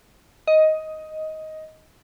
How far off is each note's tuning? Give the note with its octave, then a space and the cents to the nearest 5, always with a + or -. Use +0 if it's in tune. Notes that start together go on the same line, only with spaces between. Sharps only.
D#5 +10